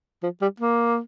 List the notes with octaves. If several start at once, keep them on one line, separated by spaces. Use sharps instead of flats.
F3
G3
A#3